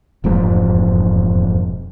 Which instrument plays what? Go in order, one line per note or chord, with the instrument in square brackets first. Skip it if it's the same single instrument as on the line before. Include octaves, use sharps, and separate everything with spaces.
[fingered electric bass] E1 F2 G#2